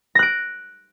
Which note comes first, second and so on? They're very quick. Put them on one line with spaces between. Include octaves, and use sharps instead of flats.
A#6 F#6 D7